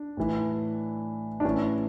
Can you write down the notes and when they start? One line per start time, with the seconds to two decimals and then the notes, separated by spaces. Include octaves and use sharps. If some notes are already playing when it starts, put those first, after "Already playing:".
Already playing: D4
0.17 A2 E3
1.40 D4
1.45 A2 E3 C#4